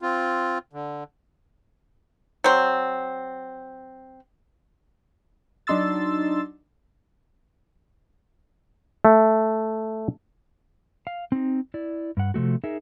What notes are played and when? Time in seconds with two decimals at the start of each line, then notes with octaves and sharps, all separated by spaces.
0.02 C4 F4
0.73 D3
2.44 F#3 C4
5.67 F#3 D4 D#4 C6 E6 A6
9.05 A3
11.07 F5
11.32 C4 D#4
11.74 E4 D5
12.17 G2 F#5
12.34 C3 F3 A3 F#4
12.64 D#4 G#4 A#4 E5